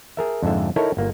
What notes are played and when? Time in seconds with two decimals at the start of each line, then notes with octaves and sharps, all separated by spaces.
0.17 G#4 A#4 E5
0.42 F2 G#2 D3 E5
0.76 D#4 E4 A4 A#4 C#5
0.97 G1 A#3